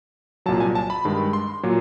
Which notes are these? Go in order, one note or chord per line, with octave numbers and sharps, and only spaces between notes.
C2 A#2 F#3 A5
G#5
A5
B5
G2 D#3 G#3
C6
A#2 F#3